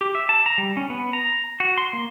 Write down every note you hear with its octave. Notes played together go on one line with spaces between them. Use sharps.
G4
E5
A5
A#5
G3
C#4
B3
A#5
F#4
C6
A#3